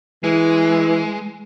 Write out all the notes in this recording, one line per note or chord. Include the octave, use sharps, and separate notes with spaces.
E3 G#3